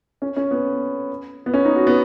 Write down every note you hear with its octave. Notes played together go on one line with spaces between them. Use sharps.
C#4
C#4
B3
B3
C#4
D#4
F#4
B3